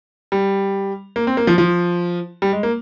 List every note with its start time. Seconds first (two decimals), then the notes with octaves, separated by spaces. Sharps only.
0.32 G3
1.16 A#3
1.27 C4
1.37 A#3
1.47 F3
1.58 F3
2.42 G3
2.53 G#3
2.63 A#3